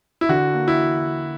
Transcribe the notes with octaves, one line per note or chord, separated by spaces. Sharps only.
E4
D3 F#4
A#3
E4